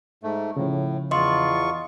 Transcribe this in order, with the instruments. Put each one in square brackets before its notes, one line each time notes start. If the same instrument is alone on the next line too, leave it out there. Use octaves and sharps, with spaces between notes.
[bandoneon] G#2 A3
[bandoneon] A2 [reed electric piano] C#3 F3
[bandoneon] E2 F4 C#6 [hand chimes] D#5 C6